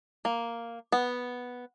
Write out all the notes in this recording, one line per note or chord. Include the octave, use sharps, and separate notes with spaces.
A#3
B3